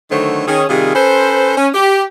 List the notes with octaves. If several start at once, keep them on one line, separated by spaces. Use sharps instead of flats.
D3 D#3 F#3 A3 C5 C#5
D#3 C#4 G#4
C3 D#3 G3 F4 G#4
C#4 A4 B4 C5
C#4
G4